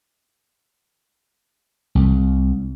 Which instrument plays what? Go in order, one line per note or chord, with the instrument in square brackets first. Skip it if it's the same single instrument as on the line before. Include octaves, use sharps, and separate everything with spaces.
[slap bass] C2